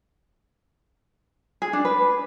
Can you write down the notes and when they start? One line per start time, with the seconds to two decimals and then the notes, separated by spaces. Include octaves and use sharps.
1.62 G#4
1.73 D4
1.85 B4